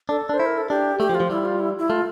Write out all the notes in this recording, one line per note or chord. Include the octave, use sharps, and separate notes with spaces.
D4 A4
D4
C5
E4
A#4
A4
D4 G4
A3 G4
F3
F4
F3
G3 E4
F4
E4
E4
A3 F4